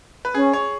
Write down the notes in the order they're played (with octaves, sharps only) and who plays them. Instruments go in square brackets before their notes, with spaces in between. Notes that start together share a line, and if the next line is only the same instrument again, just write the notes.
[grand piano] B4
[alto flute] C#4 [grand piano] G#4
[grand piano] C#5